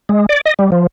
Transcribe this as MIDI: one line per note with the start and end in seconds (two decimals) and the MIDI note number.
0.09 0.26 56
0.29 0.41 74
0.46 0.54 75
0.59 0.70 55
0.72 0.87 53